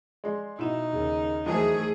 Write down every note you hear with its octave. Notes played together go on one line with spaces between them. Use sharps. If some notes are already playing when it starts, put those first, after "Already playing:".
G#3 D5 C6
B2 D#4 E4 E7
D#2 C#3
E2 D#3 F#3 A3 G#4 C5 E5 A5